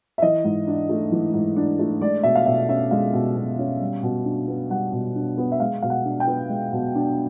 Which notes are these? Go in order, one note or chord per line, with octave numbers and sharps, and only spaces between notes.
E5
E3 D#5
G#2
D4
A3
E3
G#2
D4
A3
G#3 D5
B2 E5
F5
B2 E5
C#4 E5
G#3 F5
B2
B2
C#4
G3
B2
D4
B3
G3 F#5
B2
D4
B3
E5
G#3 F5
B2 F5
F#5
D4
G5
B3
G#3
B2
D4